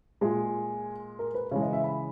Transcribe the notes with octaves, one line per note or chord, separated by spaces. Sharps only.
A#2 G#3 G#4
A#4
B4
C#3 E3 G#3 C#5
D#5
E5
B5